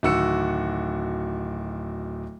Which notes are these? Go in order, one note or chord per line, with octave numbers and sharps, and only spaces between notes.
D1 D#3 F#4 E6 C#7